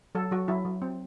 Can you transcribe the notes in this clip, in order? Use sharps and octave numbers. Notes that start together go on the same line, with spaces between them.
F#3 A4
F#3 F#4
F#3 E4
F#3
C4